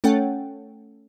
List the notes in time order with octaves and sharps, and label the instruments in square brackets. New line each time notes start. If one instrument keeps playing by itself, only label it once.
[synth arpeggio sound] A3 C#4 A4 C#5 F#5 G5